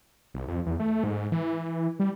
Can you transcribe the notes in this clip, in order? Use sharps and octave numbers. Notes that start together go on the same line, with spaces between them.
C2
F2
E2
A3
G#2
E3
G3